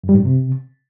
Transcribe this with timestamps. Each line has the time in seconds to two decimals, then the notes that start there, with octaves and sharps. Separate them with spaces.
0.04 F#2
0.09 G3
0.14 G#2
0.20 F#2
0.25 C3